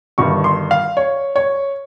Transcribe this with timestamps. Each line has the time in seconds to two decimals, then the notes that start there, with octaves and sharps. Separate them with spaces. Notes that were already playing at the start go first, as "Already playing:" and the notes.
0.18 G1 G2 D#3 C#6
0.44 C6
0.71 F5
0.97 C#5
1.36 C#5